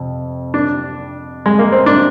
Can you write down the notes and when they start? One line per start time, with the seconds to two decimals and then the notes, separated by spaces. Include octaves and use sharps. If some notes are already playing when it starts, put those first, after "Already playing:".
Already playing: F2 C3
0.54 D4
1.46 G#3
1.59 A#3
1.72 C4
1.86 D4